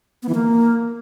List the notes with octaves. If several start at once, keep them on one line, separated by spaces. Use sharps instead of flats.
B3
E3
A#3